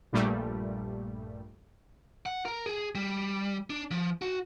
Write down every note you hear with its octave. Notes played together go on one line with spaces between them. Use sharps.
A#1 G2 A#2 G3 A3
F#5
A#4
G#4
G3
D4
F3
F#4